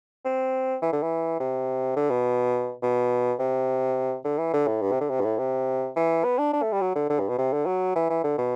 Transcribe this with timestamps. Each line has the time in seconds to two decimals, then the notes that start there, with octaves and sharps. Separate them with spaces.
0.25 C4
0.82 E3
0.92 D3
1.02 E3
1.40 C3
1.96 D3
2.10 B2
2.82 B2
3.39 C3
4.25 D3
4.38 E3
4.53 D3
4.67 A2
4.82 G2
4.91 C3
5.00 D3
5.10 C3
5.21 G2
5.25 A2
5.38 C3
5.96 E3
6.24 B3
6.38 D4
6.53 D4
6.62 A3
6.72 G3
6.81 F#3
6.96 D3
7.10 D3
7.20 G2
7.29 B2
7.38 C3
7.53 D3
7.66 F#3
7.96 E3
8.10 E3
8.24 D3
8.38 B2